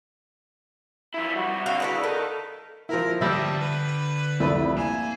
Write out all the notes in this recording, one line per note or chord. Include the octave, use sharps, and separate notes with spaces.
F3 E4 E5
C#2 G3 F#4
C4 D4 F#4 F5
C#3 D4 E4 F#4 B4
A4 A#4 D#5
F3 E4 A#4
D3 G3 E5 G5 A5 D#6 A#6
B4
C2 F2 A3 B5
A#3 G#5 E7